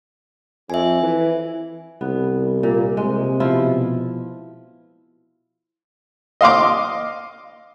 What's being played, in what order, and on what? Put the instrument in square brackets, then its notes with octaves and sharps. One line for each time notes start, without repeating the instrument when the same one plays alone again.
[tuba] F2 [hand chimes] E5 G#5
[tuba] E3
[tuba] C2 [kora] B3
[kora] A#2 [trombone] A#3
[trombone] C3 [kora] G#3
[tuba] B2 [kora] F3 E4 F4
[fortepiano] D#5 F5 C6 D6